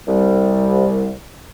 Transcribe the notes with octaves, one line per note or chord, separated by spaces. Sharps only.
C2 G3